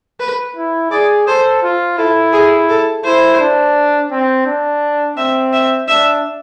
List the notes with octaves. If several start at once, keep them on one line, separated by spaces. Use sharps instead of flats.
B4
E4
G#4 D5
A4 C5
F4
E4 A4
G#4
A4
E4 C5
D4
C4
D4
C4 E5
E5
D4 E5